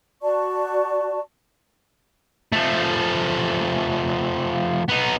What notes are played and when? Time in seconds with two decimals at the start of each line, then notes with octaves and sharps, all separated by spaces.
0.22 F#4 D5 A5 C#6
2.53 F3 A3
4.88 B3 D#4